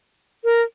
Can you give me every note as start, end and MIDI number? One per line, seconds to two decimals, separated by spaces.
0.44 0.62 70